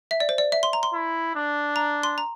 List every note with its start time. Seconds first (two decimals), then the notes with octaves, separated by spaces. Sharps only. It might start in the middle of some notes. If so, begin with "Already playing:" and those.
0.11 E5
0.20 D5
0.29 C5
0.38 D5
0.52 E5
0.63 C6
0.73 A#5
0.83 C6
0.94 E4
1.36 D4
1.76 A#5
2.03 C6
2.18 A#5